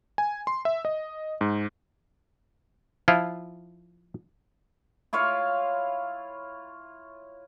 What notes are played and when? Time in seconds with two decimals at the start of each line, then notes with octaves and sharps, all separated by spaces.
0.18 G#5
0.47 C6
0.65 E5
0.85 D#5
1.41 G#2
3.08 F3 E4 F4
5.13 E4 F4 C#5 F5